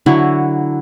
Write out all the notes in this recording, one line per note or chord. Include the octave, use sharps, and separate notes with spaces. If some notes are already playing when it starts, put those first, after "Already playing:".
D3 F#3 E4 F#4